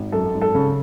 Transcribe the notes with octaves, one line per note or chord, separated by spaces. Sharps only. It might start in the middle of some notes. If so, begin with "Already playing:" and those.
Already playing: G#1
F#2 A4
G#1
A4
C#3